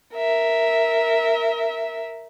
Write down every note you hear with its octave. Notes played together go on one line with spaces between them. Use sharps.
A#4 E5